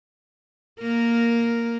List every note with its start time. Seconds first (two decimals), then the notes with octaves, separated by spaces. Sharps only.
0.81 A#3 A#4